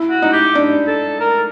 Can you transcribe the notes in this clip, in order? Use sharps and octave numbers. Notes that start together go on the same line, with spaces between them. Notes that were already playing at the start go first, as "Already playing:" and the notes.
Already playing: E4
F#4
D#4
G4
D4
A4
A#4